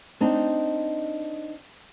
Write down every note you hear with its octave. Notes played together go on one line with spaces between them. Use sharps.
C4 D4 D#4